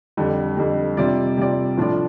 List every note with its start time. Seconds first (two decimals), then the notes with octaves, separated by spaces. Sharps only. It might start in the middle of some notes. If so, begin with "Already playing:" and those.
0.17 F2 D3 G3
0.57 F2 D3 G3
0.97 C3 G3 F4 D5
1.37 C3 G3 F4 D5
1.77 A2 F3 D4 F4 D5